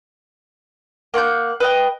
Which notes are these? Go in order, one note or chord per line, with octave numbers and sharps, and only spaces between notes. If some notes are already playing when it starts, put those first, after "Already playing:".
A#3 F#5 C#6 G6
B4 D#5 G5